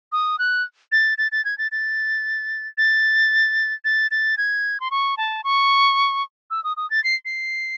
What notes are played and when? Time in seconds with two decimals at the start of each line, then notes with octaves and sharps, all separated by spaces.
0.12 D#6
0.39 F#6
0.92 A6
1.18 A6
1.32 A6
1.45 G#6
1.58 A6
1.72 A6
2.78 A6
3.85 A6
4.11 A6
4.38 G#6
4.80 C6
4.91 C#6
5.17 A5
5.44 C#6
6.51 E6
6.64 D#6
6.77 D#6
6.90 A6
7.04 C7
7.25 C7